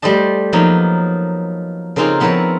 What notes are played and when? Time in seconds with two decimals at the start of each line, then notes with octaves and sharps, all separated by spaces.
0.02 G3 A3 C5 D#5 A5
0.53 F3 F#3 A#3 B3 D#4
1.96 C#3 A#3 C4 D#4 F4 G#4
2.20 F3 B3 C4 E4 A#4 C#5